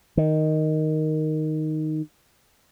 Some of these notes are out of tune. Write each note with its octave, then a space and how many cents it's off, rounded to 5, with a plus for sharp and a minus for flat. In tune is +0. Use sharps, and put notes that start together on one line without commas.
D#3 +0